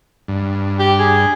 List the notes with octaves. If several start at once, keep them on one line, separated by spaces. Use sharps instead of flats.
G2
G4
G#4